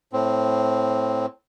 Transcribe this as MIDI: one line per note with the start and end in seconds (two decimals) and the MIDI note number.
0.13 1.26 45
0.13 1.26 60